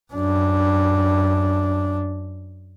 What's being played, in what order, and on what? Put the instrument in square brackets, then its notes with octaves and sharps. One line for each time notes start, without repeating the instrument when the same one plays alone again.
[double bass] F#2 D4